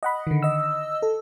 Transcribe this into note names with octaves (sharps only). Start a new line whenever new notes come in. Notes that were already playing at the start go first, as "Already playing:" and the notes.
D#5 F#5 B5
D3 D#3
D#5 E6
A4